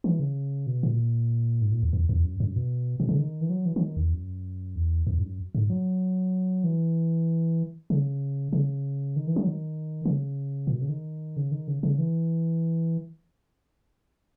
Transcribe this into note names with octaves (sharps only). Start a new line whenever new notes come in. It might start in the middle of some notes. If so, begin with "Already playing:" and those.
E3
C#3
B2
A#2
G#2
A#2
E2
E2
E2
F#2
F#2
B2
B2
C#3
D#3
E3
F#3
E3
E3
D#3
E2
F#2
E2
E2
G#2
F#2
G#2
F#3
E3
C#3
C#3
D#3
E3
F#3
D#3
D#3
C#3
A#2
B2
C#3
D#3
C#3
D#3
C#3
C#3
E3